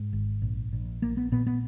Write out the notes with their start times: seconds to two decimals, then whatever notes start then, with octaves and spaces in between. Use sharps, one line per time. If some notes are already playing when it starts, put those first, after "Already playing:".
Already playing: G#2
0.13 G#1
0.42 A#1
0.73 A#1
1.02 A#1 A#3
1.17 B3
1.32 A#2 B3
1.47 B3